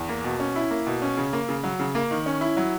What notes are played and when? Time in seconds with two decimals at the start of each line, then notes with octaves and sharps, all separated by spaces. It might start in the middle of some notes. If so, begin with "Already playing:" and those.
Already playing: E2
0.09 A#3
0.24 B2
0.40 C#4
0.56 E4
0.71 A#3
0.87 B2
1.02 C#4
1.17 C#3
1.33 A#3
1.49 C#3
1.64 F#3
1.79 C#3
1.95 A#3
2.11 D#3
2.26 C#4
2.41 E4
2.57 F#3